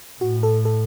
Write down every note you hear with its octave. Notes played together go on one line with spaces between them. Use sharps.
A2 F#4
A4
A4